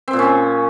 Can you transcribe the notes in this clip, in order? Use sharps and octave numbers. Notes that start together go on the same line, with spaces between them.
C4
A#2
C#4